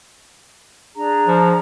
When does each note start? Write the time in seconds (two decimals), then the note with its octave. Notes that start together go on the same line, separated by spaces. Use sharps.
0.97 D4 G#4 A#5
1.27 F3